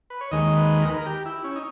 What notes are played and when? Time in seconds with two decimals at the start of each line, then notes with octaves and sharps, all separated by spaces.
0.10 B4
0.21 C#5
0.31 D#2 D#3 G#3 D#5
0.56 B4
0.82 A#4
0.89 B4
0.98 A#4
1.06 G4
1.26 E4
1.44 C#4
1.56 D#4